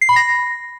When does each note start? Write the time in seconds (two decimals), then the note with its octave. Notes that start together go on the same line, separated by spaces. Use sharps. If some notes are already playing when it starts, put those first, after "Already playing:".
0.01 C7
0.09 B5
0.16 A#6